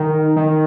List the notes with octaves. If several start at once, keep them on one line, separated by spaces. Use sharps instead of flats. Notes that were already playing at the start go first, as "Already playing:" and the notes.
Already playing: D#3
D#3